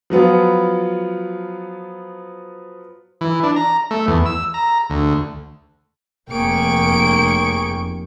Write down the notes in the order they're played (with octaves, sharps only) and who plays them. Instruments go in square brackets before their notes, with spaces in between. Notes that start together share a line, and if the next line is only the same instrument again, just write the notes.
[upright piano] F3 F#3 B3 F4
[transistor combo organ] E3
D4
A#5
A3
E2
E6
A#5
D2
[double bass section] F1 [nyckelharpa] A#3 [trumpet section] G#4 C#6 [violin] G5 D7